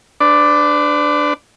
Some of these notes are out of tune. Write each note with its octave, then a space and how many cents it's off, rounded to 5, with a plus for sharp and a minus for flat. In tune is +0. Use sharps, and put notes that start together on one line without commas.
D4 +0 B4 +45 D5 +0